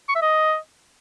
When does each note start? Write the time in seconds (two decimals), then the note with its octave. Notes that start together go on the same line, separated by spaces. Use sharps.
0.09 C#6
0.15 E5
0.22 D#5